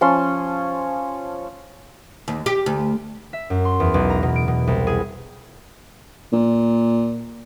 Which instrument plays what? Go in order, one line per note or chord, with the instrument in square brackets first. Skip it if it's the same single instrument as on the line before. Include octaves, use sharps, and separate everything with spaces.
[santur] F3 C#4 A5 C6
[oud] D#2
G4
D2
[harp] E5
F#2
C6
E2
B1
A#5
B2
D7
B2
C2
G#4
[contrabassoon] A#2